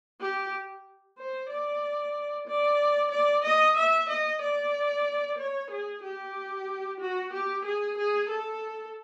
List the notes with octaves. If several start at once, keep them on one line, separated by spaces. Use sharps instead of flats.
G4
C5
D5
D5
D5
D#5
E5
D#5
D5
C#5
G#4
G4
F#4
G4
G#4
G#4
A4